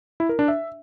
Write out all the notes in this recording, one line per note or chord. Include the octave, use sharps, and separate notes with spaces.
E4
A#4
D4
E5